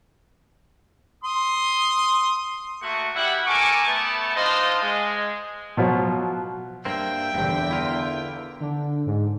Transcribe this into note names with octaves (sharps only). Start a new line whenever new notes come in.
C6 D#6
A3 A#3 F#4 C#6
G3 E4 F#5
A4 A#4 G#5 C#6 D6
A3 B3 A5
D4 D#4 F4 C5 D#5 C6
G#3
B2 F3 F#3
G2 A#3 C4 E5 G5
E2 G2 D3 C4
E4 F4 A#4
D3
G#2